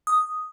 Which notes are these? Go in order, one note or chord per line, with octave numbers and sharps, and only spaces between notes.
D#6